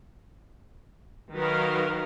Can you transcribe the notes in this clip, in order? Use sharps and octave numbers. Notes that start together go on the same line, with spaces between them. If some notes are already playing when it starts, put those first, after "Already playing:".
D#3 F#3 D#4 A#4 B4 F5